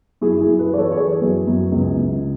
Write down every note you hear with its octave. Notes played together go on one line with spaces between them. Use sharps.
F#2 E4 G#4
E4 G#4
F#2
G#4 B4
E3 D5
A4 C#5
C#5
E3 G#4 B4
F#2
F#2
C#2
C#2